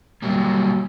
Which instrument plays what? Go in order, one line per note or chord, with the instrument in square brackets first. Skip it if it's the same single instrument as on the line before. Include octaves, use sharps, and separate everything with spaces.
[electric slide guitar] F#3 G3 A#3